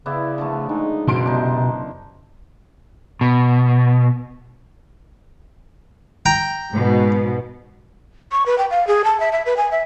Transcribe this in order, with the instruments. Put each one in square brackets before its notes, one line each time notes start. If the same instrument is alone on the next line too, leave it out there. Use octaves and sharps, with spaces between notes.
[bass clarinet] C#3 [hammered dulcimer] B3 E4 D5
[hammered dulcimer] D3 F3 A3
[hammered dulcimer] G#3 [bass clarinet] D#4
[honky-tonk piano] F#1 C6 D7 [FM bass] B2
[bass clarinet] C3 [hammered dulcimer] D4 D#4
[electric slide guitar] B2
[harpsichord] G5 A#5
[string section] G#2 B2
[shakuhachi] C#6
B4
G5
F5
G#4
A5
E5
E5
B4
G#5
E5